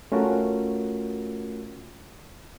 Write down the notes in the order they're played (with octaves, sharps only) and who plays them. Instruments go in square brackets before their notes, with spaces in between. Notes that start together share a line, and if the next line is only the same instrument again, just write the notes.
[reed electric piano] A3 C#4 F4 F#4 A#4